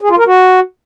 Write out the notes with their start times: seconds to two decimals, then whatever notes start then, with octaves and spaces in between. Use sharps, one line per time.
0.01 G#4
0.10 F4
0.18 A#4
0.27 F#4